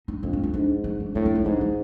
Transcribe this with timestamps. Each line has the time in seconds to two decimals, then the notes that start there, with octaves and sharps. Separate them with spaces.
0.08 D#4
0.23 F2 D4
0.33 D4
0.44 D#4
0.54 G#2 D4
0.84 D#4
1.00 D4
1.15 A2 D4
1.25 D4
1.35 D#4
1.45 G#2 D4
1.61 D#4